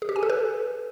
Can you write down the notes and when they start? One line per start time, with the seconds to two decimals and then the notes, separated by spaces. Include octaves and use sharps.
0.02 G#4
0.09 G4
0.16 G#5
0.23 A4
0.30 B4